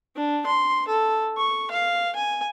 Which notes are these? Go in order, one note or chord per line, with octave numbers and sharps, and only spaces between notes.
D4
C6
A4
C#6
F5
G#5